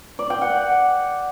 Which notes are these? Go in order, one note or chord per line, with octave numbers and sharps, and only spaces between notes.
D5
G5
F#5